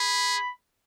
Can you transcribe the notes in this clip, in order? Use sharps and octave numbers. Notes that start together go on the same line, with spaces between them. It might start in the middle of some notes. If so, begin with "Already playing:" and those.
Already playing: G#4 B5